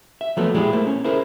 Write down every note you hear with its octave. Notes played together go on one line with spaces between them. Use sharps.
E5
F3 F#3 A3 B3
A#2 G#3 E4 G4 G#4
A3 A#3 C5
C#4
E4 G#4 A#4 C5